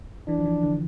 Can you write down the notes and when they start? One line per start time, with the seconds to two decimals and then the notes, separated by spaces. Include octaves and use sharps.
0.28 E3 D4
0.38 F3
0.45 E3
0.63 D3